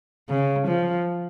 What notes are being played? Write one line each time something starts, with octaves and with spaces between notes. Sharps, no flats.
C#3
F3